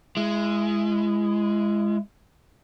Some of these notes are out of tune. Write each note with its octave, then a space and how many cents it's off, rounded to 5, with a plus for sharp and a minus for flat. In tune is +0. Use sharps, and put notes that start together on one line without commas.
G#3 +0 E4 +30